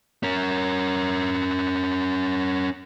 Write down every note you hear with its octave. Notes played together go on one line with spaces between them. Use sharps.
C#4 A#4